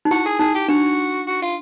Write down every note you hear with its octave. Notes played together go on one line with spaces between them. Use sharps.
D#4
E4 F#4
G#4
D#4 G#4
G4
D4 F#4
F#4
F4